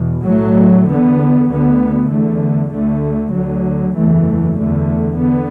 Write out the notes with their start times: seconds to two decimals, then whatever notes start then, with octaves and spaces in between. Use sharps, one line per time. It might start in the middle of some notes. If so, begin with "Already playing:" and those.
Already playing: E2 B2
0.26 B1 A2 F#3 A3
0.88 E2 D3 B3
1.50 D2 D3 B3
2.11 E2 D3 A3
2.73 D2 D3 A3
3.35 D2 D3 F#3
3.96 F#1 E2 E3 A3
4.58 E2 D3 A3
5.20 D3 B3